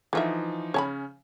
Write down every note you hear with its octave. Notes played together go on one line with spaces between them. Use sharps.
D3 E3 F3 D#4 F4 E5
C#3 C#4 C#5 A5 B5